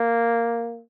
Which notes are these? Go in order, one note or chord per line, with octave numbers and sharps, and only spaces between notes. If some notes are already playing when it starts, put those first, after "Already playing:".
Already playing: A#3